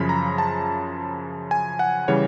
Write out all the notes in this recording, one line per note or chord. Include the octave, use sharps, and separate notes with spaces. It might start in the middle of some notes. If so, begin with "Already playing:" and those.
Already playing: F#2 C#3 F3 B5
A#5
A5
G#5
F#5
C#3 E3 G3 C#5